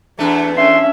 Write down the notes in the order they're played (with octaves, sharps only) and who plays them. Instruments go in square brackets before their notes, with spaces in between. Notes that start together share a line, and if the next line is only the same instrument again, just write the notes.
[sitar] E2 A3 [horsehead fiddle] D4
[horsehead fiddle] C#4 D4 [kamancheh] E5 [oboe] C6